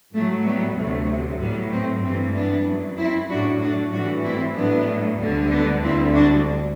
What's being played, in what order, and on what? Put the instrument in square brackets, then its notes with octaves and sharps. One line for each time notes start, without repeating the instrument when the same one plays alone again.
[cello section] A2 F#3 A3
G3 B3
D2 C3 F#3 A3
A2 F#3 G3 B3
A3 C4
G2 E3 G3 A3 C4
B3 D4
F#2 F#3
C4 E4
A2 F#3 D4 F#4
D4 F#4
A2 E3 G3 D4 F#4
C4 E4
A2 F#3 B3 D4
D2 D3 G3
B3 D4
D2 D3 G3 C4 E4
D4 F#4